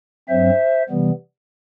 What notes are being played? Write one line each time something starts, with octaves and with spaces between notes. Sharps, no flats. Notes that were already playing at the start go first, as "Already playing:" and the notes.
G2 F#3 C4 C5 E5
C3 E3 G3 B3